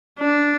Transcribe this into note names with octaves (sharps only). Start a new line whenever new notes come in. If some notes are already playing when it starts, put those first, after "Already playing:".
D4